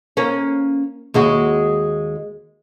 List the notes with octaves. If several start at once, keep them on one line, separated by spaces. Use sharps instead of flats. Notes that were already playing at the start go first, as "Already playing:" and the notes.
A#3 C#4
D#2 G#3 F#4